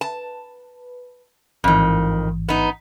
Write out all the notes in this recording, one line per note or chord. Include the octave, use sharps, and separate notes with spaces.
B4 A5
A1 F2 G#2 D#3 E3
B3 D#4